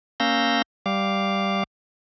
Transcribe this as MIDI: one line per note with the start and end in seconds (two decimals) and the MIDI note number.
0.20 0.62 58
0.20 0.62 61
0.20 0.62 77
0.20 0.62 88
0.20 0.62 91
0.20 0.62 94
0.86 1.63 55
0.86 1.63 77
0.86 1.63 86